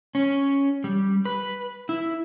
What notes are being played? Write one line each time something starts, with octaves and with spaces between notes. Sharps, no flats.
C#4
G3
B4
E4